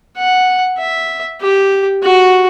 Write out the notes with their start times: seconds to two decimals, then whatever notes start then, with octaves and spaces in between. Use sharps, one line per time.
0.17 F#5
0.78 E5
1.41 G4
2.03 F#4